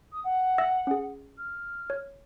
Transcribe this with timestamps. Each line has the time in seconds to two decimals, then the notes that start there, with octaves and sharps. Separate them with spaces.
0.12 D#6
0.24 F#5
0.58 E5 E6 A#6
0.87 C#4 G#4
1.38 F6
1.90 C#5